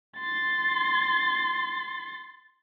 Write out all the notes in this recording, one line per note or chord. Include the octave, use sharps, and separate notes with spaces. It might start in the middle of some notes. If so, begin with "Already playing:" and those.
C6 A6